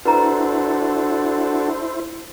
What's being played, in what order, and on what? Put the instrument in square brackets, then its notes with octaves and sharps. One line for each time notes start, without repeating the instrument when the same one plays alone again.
[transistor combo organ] D4 F#4 A4 [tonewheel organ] E4 C5 [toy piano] B4 A#5